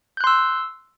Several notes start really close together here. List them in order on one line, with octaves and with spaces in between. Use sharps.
G6 F#6 C6 E6